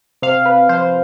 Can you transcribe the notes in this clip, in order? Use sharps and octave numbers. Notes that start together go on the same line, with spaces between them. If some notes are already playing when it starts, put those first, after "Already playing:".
C3 F5
B4
F3 C5